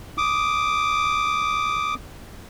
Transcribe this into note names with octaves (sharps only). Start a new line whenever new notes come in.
D6 D#6